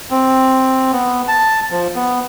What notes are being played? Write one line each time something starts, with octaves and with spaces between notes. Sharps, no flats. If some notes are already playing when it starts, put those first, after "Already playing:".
C4
B3
A5
F3
B3